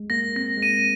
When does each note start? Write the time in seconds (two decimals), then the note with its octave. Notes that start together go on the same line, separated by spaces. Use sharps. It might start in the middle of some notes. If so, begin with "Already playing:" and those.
Already playing: G#3
0.10 A#3 A#6
0.36 C4 A#6
0.57 G#3
0.62 A#3 D#7